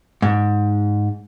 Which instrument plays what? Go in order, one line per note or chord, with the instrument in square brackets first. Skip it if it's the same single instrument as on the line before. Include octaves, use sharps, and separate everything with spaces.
[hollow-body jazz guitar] G#2